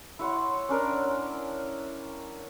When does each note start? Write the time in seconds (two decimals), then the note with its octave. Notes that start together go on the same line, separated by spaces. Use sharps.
0.19 E4 C#5 F#5 C6
0.69 C#4 D4 A#4